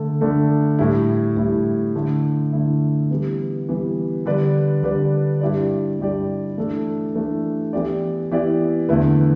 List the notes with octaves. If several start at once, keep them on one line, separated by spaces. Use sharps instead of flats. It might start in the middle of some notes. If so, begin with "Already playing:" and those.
Already playing: D3 A3 D4 A4
D3 A3 D4 A4
A2 G3 E4
A2 G3 E4
D3 A3 E4
D3 A3 E4
E3 G3 B3
E3 G3 B3
D3 G3 D4 B4 D5
D3 G3 D4 B4 D5
G2 G3 E4 G4 D5
G2 G3 E4 G4 D5
E3 A3 D4 A4
E3 A3 D4 A4
E3 B3 E4 G4 D5
E3 B3 E4 G4 D5
E2 D3 A3 E4 B4